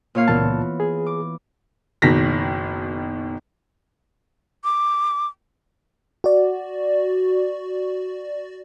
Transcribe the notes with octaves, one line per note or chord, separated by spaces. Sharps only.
A#2 C#5 F5
C#2 A#2 E3 B3 A5
G#4
D6
F#1 B2 D#3 A#6 B6
D6
F#4 D5